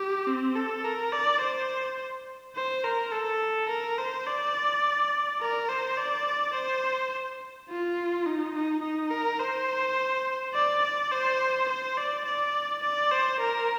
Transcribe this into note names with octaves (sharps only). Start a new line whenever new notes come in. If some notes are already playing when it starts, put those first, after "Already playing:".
Already playing: G4
C4
A4
A#4
D5
C5
C5
A#4
A4
A#4
C5
D5
A#4
C5
D5
C5
F4
D#4
D#4
D#4
A#4
C5
D5
D5
C5
C5
D5
D5
D5
C5
A#4